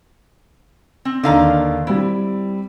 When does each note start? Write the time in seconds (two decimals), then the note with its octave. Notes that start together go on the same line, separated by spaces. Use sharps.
1.05 C4
1.23 D#2 D3 D#3 F5 A#5
1.87 G3 C4 E4